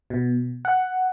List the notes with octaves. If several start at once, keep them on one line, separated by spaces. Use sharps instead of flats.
B2
F#5